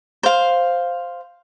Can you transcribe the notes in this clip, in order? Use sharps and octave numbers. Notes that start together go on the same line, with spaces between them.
C5 F5